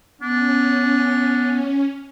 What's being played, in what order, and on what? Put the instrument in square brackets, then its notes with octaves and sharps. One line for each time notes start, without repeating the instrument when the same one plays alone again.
[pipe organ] B3 [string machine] C#4 [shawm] D4